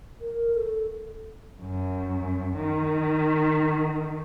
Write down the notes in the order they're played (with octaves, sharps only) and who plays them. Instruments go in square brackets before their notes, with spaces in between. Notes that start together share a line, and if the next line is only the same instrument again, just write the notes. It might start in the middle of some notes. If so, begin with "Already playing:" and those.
[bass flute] A#4
A4
[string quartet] F#2
D#3